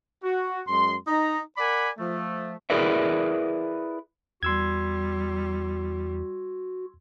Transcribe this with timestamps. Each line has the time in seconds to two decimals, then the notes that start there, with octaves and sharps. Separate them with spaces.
0.23 F#4
0.67 F#2 G#3 C6
1.07 D#4 A#5
1.57 A#4 D5 F#5 G#5 B5
1.98 F3 A3
2.70 E4 G#4 A#4 B4 D5 E5
4.43 E2 G3 F#4 C6 E6 G#6